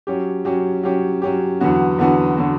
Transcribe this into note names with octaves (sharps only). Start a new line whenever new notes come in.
F#3 C#4 G4
F#3 C#4 G4
F#3 C#4 G4
F#3 C#4 G4
E2 D3 F#3 B3 F#4
E2 D3 F#3 B3 F#4
D3 F#3 B3 F#4